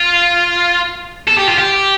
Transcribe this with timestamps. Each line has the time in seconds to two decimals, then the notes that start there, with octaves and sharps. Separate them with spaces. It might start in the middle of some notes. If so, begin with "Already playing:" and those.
Already playing: F4
1.28 A4
1.38 G4
1.49 F4
1.59 G4